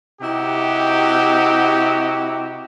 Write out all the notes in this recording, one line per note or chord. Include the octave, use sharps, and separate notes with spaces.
C3 D#4 E4 F#4 G4